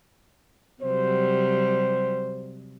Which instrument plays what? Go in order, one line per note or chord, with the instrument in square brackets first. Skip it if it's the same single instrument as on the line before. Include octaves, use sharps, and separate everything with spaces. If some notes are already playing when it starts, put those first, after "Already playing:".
[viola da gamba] C3 F#3 G3 [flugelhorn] C5